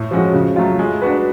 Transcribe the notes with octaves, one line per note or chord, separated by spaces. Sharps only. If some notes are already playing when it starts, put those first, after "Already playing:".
Already playing: A2
F3 G#3 C#4 F#4
C#3
F#3 A3 F4
G#3
D4 F#4 B4